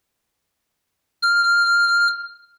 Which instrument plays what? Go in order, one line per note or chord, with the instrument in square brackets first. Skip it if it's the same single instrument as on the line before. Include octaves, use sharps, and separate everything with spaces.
[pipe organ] F6